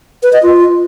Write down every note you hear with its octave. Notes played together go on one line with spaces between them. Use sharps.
B4
D#5
F4